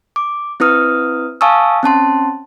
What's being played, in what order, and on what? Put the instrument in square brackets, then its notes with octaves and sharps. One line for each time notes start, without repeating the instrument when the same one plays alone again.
[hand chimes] D6
C4 E4 B4 D#6 F6
F5 G#5 A5 C#6 D#6 E6
C4 C#4 A5 C6